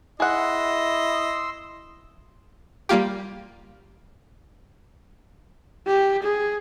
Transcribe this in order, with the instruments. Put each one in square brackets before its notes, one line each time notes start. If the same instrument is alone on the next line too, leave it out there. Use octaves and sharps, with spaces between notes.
[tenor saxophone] E4 [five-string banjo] G#4 F#5 [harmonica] D#5 [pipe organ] C6 E6
[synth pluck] G3 A#3 F4 G4
[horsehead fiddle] G4
G#4